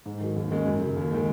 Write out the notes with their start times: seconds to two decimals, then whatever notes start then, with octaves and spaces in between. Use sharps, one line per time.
0.06 G#2
0.20 D#3 F#3
0.36 D#2
0.51 D#3 G#3 C#4
0.66 F#2
0.81 C#3 F#3
0.96 D#2
1.11 D#3 G#3